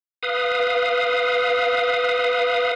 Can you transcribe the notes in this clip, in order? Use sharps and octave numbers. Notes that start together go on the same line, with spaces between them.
B4 F5 D#6